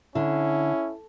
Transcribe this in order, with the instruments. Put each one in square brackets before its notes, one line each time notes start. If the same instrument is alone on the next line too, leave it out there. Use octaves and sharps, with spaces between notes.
[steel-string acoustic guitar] D3 [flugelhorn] C#4 [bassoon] E4